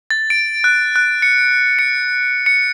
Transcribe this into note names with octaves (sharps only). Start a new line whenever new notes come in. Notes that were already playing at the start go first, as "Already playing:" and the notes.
A6
D7
F#6
F#6
C#7
C#7
C#7